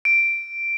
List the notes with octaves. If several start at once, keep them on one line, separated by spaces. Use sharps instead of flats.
D7